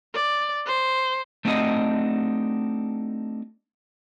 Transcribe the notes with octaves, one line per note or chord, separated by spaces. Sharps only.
D5
C5
A3 C4 D4 D#4 F#4 D#5